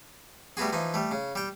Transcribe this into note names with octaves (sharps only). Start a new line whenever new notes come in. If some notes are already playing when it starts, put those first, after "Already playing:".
G3 A3 B3 F#4 G#4
E3 F3 D#4
G3 A3
C#3
G3 G5